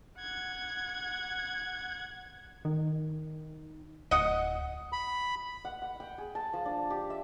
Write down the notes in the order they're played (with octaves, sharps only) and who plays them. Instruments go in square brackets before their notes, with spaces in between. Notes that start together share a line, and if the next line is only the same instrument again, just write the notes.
[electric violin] F#5 G#6
[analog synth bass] D#3
[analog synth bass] D1 [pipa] D#5 F#5
[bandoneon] B5
[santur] F#5
F#5
G5
G#4
A5
F3
D4
G4
E5